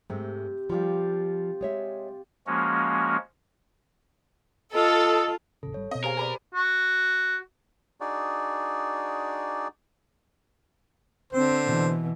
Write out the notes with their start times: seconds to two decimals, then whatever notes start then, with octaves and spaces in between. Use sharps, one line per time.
0.10 G#2 C3 G#3 A3
0.70 F3 G3 F4 G4 C6
1.61 G#3 C#5 E5
2.47 F3 G#3 A#3 C#4 F#4
4.75 F4 A4 D#5 D#6 E6
5.63 D#1 A1 C#3 A4
5.74 G#1 G3 C#5
5.91 B2 C4 D#5
6.04 G4 G#4 A#4 C5 F5
6.17 G#4 B4 D5
6.54 F#4
8.01 D4 D#4 F#4 G#4 D5
11.33 D3 C4 C5
11.65 B2 E3